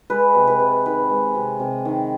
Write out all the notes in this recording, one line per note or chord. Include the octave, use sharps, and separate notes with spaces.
G#3 B4
C3
B4
C3
D#3 B4
G#3
C3
C3
D#3